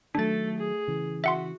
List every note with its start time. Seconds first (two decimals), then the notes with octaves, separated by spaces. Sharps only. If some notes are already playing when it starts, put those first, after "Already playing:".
0.15 D#3 F3 F#3 A3 D4 A4 A6
0.58 G#4
0.88 C#3 E3
1.24 F#4 E5 F#5 C6